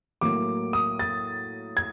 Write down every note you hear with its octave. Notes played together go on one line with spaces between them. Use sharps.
A2 F#3 A#3 D6
D#6
A6
G#6